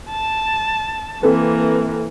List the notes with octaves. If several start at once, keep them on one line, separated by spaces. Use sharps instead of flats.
A5
E3 A#3 C4 A4 B4